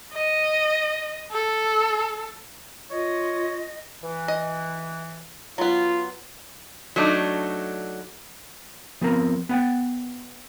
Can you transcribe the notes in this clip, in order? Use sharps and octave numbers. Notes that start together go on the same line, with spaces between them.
D#5
A4
F4 C#5 D#5
E3
D#5
F#3 B3 F4
F#3 A3 D4 D#4
F3 B3 C4 A#4
B3 F#5 G5